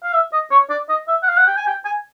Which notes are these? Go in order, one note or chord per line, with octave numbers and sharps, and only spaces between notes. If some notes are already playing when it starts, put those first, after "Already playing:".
F5
E5
D#5
C#5
D5
D#5
E5
F#5
F5
F#5
G5
G#5
G5
G#5